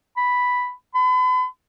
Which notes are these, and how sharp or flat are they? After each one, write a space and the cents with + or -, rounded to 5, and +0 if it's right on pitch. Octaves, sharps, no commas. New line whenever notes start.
B5 +0
B5 +40